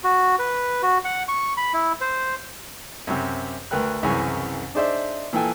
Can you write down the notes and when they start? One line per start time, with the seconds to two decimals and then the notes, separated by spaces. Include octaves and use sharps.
0.04 F#4
0.39 B4
0.83 F#4
1.05 F#5
1.28 C#6
1.57 B5
1.74 E4
2.01 C5
3.07 F#2 C3
3.71 D2 A#4 B4 G5 F#6
4.03 C2 F#2 C#3 E3 G#5
4.74 D4 D#4 G#4 C5 D5 E5
5.33 A#2 E3 A4 G5 G#5